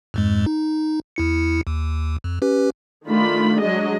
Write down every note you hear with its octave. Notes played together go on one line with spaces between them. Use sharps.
F2 G#2 G#3
D#4
E2 E4 C#7
D#2
F2
C#4 G4 B4
D#3 A3 D4 F4 B5
F#3 G#3 D4 G#4 D#5